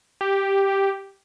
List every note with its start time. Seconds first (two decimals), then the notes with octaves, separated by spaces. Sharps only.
0.21 G4